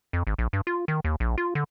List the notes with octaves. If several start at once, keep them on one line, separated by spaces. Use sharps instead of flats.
F2
G#1
A#1
G2
F4
D#3
D#2
A#1
F4
D3